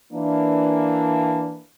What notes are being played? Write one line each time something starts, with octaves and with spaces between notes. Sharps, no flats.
E3 A#3 D4